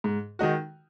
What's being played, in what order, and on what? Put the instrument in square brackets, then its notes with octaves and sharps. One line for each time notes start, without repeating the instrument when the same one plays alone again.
[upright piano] G#2
D#3 G#3 D#4 F#4